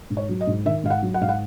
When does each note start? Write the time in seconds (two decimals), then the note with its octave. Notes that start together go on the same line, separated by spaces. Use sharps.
0.10 G#2
0.17 C#5
0.29 F#3
0.41 D#5
0.47 G#2
0.65 D#3 E5
0.84 G#2 F5
0.90 F#5
1.02 F#3
1.14 F#5
1.21 G#2 F5
1.29 F#5